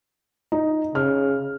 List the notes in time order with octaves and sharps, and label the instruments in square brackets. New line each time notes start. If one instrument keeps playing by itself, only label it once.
[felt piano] D#4
[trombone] C#3 [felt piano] F6